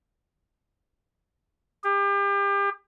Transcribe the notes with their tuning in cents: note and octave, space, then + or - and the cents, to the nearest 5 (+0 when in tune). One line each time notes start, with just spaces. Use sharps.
G4 +35